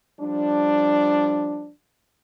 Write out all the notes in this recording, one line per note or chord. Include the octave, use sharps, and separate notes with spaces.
F3 G3 D4